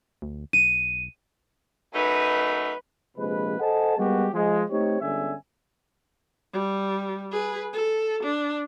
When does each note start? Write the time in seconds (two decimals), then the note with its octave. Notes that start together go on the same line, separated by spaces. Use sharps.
0.22 D2
0.53 B1 D#7
1.94 F#2 A3 D#4 B4
3.17 A#1 C3 F3 G#3 B4
3.60 A4 C5 D#5 F#5 G#5 A5
3.97 G3 G#3 A#3 B3 F#4 G4
4.33 F3 G#3
4.71 A3 C4 D#4 G4 C#5
5.01 G1 D3 G#3 C#4 E5 G#5
6.53 G3
7.32 G#4 B4
7.73 A4
8.24 D4